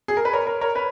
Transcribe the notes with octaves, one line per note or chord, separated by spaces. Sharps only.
G#4
A#4
B4
A#4 C#5
A#4
A#4 C#5
B4